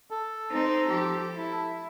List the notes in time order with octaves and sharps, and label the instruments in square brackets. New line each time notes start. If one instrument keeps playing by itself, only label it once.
[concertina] A4
[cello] C4 D#4
F3 G4
E4